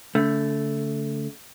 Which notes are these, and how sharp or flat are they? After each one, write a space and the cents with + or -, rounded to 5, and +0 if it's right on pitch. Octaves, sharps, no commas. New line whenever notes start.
D3 -45 A3 +0